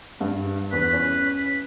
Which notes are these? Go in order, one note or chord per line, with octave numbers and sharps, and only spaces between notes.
G2
E2 B4
C#4